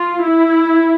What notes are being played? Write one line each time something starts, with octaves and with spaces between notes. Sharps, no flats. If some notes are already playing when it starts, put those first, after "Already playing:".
Already playing: F4
E4